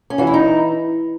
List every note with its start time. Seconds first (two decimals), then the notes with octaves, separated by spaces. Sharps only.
0.10 C#4
0.18 E3 F#4
0.27 E4
0.34 D#4